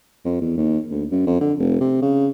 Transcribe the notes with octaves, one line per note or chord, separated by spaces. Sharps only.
F2
E2
D#2
D2
F#2
F2
D3
F1
C3
C#3